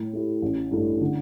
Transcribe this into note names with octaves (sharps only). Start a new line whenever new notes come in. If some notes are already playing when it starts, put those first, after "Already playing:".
Already playing: A2
A3 E4 G4
A1
G2 E3 A3
D3